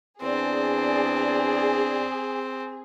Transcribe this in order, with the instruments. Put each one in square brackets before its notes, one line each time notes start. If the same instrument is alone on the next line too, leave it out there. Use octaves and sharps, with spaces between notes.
[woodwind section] E2 D4 D5 [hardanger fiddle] C4 [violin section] G#4